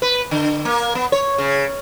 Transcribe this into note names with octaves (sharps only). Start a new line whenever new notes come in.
B4
D3
A#3
B3
C#5
C#3